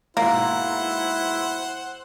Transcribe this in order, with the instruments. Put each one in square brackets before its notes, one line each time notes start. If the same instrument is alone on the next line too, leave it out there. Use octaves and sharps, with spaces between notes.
[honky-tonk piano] G#2 B2 [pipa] A#3 [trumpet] E4 [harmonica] C5 F#5